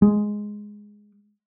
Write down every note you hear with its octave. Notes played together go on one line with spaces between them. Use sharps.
G#3